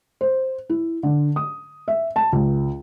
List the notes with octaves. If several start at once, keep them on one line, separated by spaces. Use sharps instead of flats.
C5
E4
D3
D#6
E5
A5
C#2